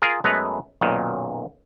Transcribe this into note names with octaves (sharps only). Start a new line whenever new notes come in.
F4 G#4 A#4
F#2 G#3 A3 B3 B4 A#5
B1 F#2 A#2 D#3